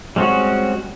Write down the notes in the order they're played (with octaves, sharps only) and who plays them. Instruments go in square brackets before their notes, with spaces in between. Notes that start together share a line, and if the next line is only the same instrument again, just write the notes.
[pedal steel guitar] G3 G#3 C4 C#4 F#4